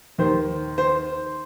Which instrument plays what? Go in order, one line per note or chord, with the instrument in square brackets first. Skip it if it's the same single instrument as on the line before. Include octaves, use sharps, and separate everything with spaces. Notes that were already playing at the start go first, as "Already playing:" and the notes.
[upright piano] D#2 D#3 C5
C5